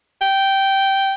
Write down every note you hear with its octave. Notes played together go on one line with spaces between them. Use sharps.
G5